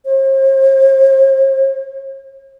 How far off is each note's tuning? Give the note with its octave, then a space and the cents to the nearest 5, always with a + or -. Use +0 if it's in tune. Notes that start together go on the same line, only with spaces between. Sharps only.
C5 +45